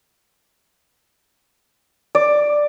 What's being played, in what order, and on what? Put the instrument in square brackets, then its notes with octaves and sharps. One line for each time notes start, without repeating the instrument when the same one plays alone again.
[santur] D5